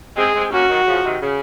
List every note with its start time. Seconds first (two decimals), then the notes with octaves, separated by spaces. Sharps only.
0.17 G#3 C4 G#4
0.34 G#3 C4
0.52 A#3 C#4 F#4
0.69 D#3 F#3
0.87 C#3 F3
1.04 C3 D#3
1.21 C#3